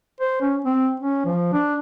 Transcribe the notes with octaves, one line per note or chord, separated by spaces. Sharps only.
C5
C#4
C4
C#4
F3
D4